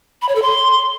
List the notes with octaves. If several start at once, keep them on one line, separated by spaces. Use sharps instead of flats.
B5
C#5
A4
C6